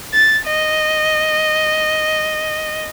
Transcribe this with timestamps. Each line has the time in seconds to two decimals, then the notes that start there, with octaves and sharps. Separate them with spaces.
0.14 A6
0.47 D#5